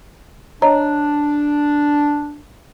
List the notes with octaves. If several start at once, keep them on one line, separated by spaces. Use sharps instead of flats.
D4 C#5 D#5 A#5